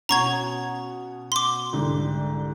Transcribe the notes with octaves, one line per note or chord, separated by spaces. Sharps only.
B2 C#4 F#5 A#5 C#6 G#6
C6 D6
C2 G#2 D3